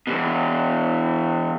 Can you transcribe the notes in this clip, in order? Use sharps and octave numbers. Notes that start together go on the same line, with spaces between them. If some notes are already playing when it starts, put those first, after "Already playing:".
E2 B2